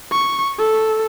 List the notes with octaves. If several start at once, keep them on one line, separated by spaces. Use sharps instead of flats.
C#6
A4